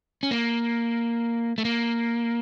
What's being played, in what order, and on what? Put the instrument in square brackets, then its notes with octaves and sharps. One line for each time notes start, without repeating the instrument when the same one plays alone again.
[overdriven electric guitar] C#4
A#3
A3
A#3